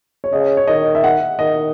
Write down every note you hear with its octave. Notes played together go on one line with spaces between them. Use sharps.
C#5
C#3 D#5
C#5
D#3 D#5
E5
F#5
D#3 D#5